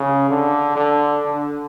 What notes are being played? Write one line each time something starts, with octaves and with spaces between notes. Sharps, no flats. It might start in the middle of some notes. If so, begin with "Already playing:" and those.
Already playing: C#3
D3
D3
D3